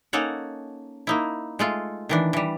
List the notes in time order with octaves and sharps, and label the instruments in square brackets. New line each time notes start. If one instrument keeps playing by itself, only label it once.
[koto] A#3 C#4 D#4 A4 C#5 F#5
A#3 D#4 E4
G#3 A3 F4
D#3 E3 D4
E3 G3